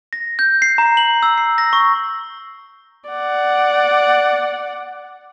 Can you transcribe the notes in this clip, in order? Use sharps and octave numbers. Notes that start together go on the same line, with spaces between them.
A#6
G6
C7
A#5
F#7
E6
C7
A#6
C#6
D5 F#5